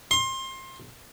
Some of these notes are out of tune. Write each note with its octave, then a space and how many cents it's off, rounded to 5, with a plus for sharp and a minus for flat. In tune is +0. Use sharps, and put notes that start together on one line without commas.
C6 +25